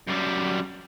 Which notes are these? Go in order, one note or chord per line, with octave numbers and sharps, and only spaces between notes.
F#2 G3